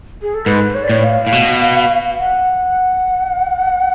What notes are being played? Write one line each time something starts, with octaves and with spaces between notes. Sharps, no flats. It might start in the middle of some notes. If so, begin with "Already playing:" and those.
G#4
A4
G#2 B4
C#5
D5
A2 C#5
F5
A2
B2
F#5